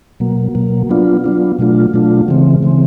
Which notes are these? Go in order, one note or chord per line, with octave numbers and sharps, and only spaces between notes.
B2 F#3 A#3
B2 F#3 A#3
F#3 B3 D4 F4
F#3 B3 D4 F4
B2 F#3 A3 D4 F4
B2 F#3 A3 D4 F4
C#3 E3 G#3 C4
C#3 E3 G#3 C4